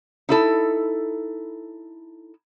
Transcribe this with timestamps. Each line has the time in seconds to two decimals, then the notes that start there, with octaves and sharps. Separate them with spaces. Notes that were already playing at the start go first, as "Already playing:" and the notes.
0.29 D#4 E4 A4